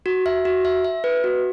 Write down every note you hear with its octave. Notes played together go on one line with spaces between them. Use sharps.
F#4
E5
F#4
E5
E5
B4
F#4